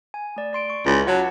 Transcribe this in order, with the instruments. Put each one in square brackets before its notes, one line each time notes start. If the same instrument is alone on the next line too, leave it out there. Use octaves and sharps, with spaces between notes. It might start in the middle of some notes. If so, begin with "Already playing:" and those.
[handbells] G#5
A3 D5
D5 C6 D7
C#6
[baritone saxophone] C#2 [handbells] E4 F4
[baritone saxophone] F#3 [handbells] F#5 A5